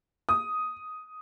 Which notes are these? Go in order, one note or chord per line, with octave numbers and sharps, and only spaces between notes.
D#6